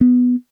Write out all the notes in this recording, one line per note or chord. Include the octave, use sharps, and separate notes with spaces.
B3